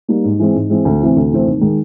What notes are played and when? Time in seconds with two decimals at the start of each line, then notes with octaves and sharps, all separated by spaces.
0.08 G3 A#3 D#4
0.24 G#2
0.39 E3 G#3 C4
0.54 G#2
0.70 E3 G#3 C4
0.85 D2
1.01 C3 E3 A3 C4
1.16 D2
1.31 C3 E3 A3 C4
1.46 D#2
1.61 D#3 G#3